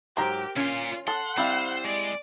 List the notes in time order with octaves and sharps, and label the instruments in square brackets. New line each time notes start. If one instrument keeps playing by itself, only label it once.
[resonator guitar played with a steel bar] G#2 F#3 [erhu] G4 [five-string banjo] A#4 C5
[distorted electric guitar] A#2 [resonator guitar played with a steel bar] C#4 [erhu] F4
[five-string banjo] A4 [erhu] F#5 [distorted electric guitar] C6
[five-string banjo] G3 [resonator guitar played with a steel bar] C4 E4 F5 [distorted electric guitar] C5
[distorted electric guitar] G#3 [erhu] D5